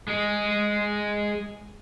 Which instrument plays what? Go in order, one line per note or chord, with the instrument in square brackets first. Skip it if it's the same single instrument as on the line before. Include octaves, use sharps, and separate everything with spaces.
[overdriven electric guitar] G#3 G#4